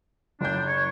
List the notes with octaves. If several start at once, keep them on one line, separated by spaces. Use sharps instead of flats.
F#1 D4 G6
C#5